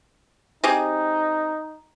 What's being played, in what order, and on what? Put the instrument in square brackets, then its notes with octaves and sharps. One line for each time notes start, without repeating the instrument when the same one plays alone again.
[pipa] C4 G4 G#4 [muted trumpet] D#4